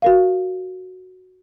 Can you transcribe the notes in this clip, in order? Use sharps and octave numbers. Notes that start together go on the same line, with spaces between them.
F#4 A#4 F5